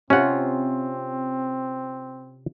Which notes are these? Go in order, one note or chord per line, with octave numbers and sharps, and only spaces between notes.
C3 C4 C#4 F4 F#5